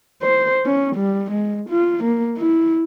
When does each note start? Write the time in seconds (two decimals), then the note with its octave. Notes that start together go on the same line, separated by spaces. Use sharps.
0.23 C5
0.65 C#4
0.95 G3
1.31 G#3
1.69 F4
2.04 A#3
2.38 E4